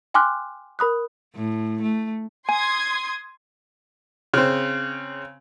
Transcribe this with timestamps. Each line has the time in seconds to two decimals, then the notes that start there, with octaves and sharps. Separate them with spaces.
0.14 G5 G#5 C6 D6 F6 F#6
0.79 A#4 B5 D#6 F#6
1.34 A2
1.82 A3
2.49 G#5 C6 D#6 G#6
4.34 C#3 C4